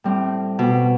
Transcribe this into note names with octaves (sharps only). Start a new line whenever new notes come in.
A2 G3 C4
B2 G3